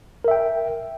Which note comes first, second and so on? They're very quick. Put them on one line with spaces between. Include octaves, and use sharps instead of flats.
A#4 E5 G5